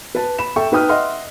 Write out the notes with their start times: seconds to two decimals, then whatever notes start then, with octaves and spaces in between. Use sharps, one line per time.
0.15 B4 A5
0.39 B5 E7
0.56 A4 E5 G5 C#6
0.72 D#4 B4 G5 D#6 F6
0.89 D#5 E5 F#5 C6 F6